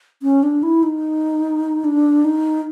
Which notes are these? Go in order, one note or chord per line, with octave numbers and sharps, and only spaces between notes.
C#4
D4
E4
D#4
D4
D#4